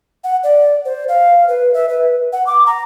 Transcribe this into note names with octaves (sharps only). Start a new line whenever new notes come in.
F#5
D5
C5
F5
B4
E5
B4
F#5
D6
A#5